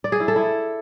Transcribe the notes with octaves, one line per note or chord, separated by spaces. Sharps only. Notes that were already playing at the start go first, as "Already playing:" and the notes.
D5
G#4
E4
A4
E4